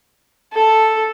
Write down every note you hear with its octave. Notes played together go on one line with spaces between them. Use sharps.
A4